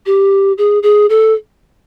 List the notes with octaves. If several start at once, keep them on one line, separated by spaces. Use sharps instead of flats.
G4
G#4
G#4
A4